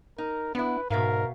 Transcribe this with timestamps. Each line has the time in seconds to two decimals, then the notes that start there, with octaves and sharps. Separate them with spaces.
0.18 D#4 A#4
0.55 B3 D4 E4 B4
0.90 G#2 B2 A#4 E5 F5